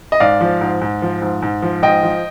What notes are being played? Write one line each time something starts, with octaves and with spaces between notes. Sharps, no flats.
D#5
G#2 D5 F5
F3
G#2
G#2
F3
G#2
G#2
F3
G#2 D#5 G5
F3